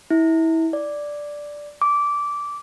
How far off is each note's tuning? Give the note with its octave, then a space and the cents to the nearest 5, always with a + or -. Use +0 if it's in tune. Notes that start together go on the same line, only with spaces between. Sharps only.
E4 -25
D5 +0
D6 -15